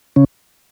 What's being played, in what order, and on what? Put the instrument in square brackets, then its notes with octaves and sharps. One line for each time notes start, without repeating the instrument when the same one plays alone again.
[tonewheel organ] C#3 C#4